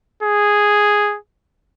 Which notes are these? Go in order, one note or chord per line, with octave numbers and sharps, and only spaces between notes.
G#4